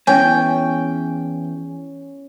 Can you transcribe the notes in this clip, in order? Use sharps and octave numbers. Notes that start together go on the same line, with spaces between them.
E2 C#4 G5 G#5